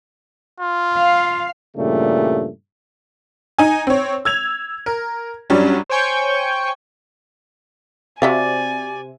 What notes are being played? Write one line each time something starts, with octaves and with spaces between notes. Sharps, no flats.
F4
F5
G2 A#2 C#3 E3 G3 A3
D#4 G#5
C4 C#5
E6 G#6 F7
A#4
F#2 F#3 G3 C#4 D4
C5 C#5 G5 G#5 C#6 G6
C3 F#4 D5 E5 F5 G#5